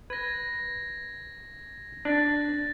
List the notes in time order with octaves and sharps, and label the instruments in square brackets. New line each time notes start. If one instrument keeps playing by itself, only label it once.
[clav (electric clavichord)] B4 [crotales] G#6 A#6
[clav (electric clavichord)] D4 [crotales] F#6 A6